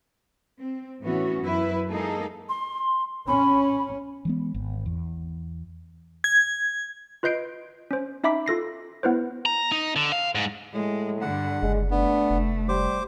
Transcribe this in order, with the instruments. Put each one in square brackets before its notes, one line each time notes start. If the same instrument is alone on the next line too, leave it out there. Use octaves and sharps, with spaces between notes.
[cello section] C4
A2 E3 B3 C#4 F#4
F#2 E4 B4
G#3 A#3 D#4 G#4 A4
[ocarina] C6
[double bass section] C#4 [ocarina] B5
[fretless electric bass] E3 G#3 B3
G#1
E2
[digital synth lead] G#6
[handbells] F4 B4 D#5 G6 C7 D7
C#4 C5
C#4 D#4 E5 B5 D6 B6
F4 A4 A#6 C7
B3 E4 B4 C5
[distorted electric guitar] A#5
D#4
D3
F5
G#2
[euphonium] A2 [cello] G#3
[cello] G2 D3 [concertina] F#5
[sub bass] F#1 [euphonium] G#3
[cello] A3 [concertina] B3 [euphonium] D4
[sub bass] F1
[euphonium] G3 [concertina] C5 D6